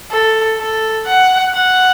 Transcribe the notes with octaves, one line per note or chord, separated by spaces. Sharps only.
A4
A4
F#5
F#5